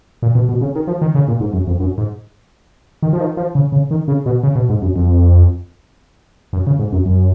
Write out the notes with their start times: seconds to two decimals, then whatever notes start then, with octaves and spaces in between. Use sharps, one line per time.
0.23 A#2
0.35 B2
0.49 B2
0.61 C#3
0.76 D#3
0.87 F3
1.02 D#3
1.15 C#3
1.28 A#2
1.40 G#2
1.53 F#2
1.67 F2
1.80 F#2
1.98 G#2
3.02 D#3
3.13 F3
3.20 D#3
3.37 F3
3.55 C#3
3.72 C#3
3.91 D#3
4.08 C#3
4.26 B2
4.43 C#3
4.55 B2
4.69 G#2
4.82 F#2
4.96 F2
6.53 F#2
6.67 C#3
6.79 G#2
6.93 F#2
7.06 F#2